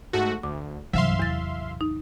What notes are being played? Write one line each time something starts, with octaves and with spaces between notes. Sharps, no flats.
G#2 A3 F#4
D2 D6
C2 G2 C3 E3 F#3 E5 F5 C6
A1 E2 A6
D#4